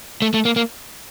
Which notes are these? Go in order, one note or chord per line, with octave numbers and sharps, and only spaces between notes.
A3
A3
A#3
A#3